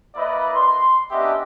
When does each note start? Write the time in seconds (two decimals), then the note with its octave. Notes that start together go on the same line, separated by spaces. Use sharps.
0.15 A#3 E4 B4 D5 D#5 B5
0.55 C6
1.11 B3 C#4 D4 G4 D#5 E5